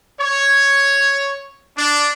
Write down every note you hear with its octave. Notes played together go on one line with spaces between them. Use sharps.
C#5
D4